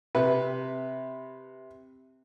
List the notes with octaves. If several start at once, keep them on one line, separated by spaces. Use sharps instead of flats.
C3 B4